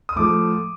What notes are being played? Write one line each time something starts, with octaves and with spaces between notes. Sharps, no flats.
D#6
A2 F3 A3 D6